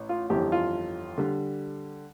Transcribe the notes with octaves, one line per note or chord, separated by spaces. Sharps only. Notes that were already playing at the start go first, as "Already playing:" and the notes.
Already playing: A1
F4
G1 F2 E3 G3 G4
F4
D3 G3